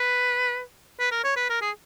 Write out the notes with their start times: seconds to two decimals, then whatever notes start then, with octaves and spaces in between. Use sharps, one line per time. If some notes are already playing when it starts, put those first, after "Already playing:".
Already playing: B4
1.00 B4
1.11 A#4
1.24 C#5
1.37 B4
1.50 A#4
1.62 G#4